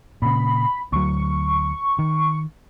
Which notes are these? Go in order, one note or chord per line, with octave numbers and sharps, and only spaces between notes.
A#2 C#3 B5
D2 F#3 C#6
D#3